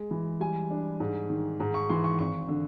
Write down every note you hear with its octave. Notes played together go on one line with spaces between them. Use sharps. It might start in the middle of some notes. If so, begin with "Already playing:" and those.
Already playing: G#3
E3
G3 G#5
D4
G#2
D#3
G#2 A#5
C#6
E3 C6
C#6
G#1 C#6
D3